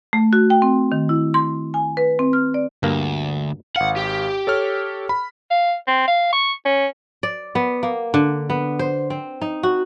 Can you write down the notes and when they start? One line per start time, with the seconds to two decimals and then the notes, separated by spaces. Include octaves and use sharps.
0.13 A3
0.33 F#4
0.50 G5
0.62 C4
0.92 D#3
1.09 E4
1.34 C6
1.74 G#5
1.97 B4
2.19 C4
2.33 F6
2.54 D5
2.83 D2 G2 A#3
3.76 G#1 F5 F#5
3.96 G4
4.47 A4 C#5 F6
5.09 B5
5.50 F5
5.87 C4
6.07 F5
6.33 C#6
6.65 C#4
7.23 D5
7.55 B3
7.83 A#3
8.14 D3
8.50 B3
8.79 C5
9.10 C4
9.42 D#4
9.63 F#4